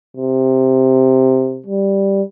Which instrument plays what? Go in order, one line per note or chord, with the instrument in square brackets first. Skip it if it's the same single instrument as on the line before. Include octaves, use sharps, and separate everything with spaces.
[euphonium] C3
G3